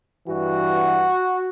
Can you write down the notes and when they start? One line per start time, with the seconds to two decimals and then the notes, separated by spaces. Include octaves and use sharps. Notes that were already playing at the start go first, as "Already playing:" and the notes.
0.27 G2 E3 F#4